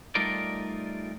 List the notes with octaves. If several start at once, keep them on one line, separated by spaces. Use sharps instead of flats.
G3 A3 D#4 F4 A#4 D5